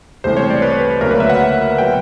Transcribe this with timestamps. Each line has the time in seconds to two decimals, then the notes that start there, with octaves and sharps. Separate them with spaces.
0.24 C2 C3 E3 A3 C4 C5
0.37 C#5
0.50 D5
0.62 B4
1.01 D2 C#3 F#3 A#3 A#4
1.11 B4
1.20 E5
1.30 F#5
1.78 B2 F#3 G5